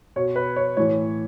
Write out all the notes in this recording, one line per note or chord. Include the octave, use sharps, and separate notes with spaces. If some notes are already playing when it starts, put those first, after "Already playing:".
B2 C#5
B4
C#5
A2 E3 C#5